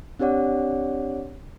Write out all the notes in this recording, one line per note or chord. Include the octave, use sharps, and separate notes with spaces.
C4 D4 G4 C#5 D5 F#5